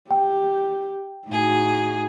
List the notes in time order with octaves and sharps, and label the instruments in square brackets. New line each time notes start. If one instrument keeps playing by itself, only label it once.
[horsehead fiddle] G4 [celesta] G5
[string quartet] A2 G#4 [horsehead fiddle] D#4 F#4